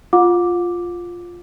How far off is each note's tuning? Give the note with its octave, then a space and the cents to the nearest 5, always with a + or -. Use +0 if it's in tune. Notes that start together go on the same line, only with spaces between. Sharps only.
F4 +0 F#5 -40 D6 +0